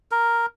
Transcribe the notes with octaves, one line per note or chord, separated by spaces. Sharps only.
A#4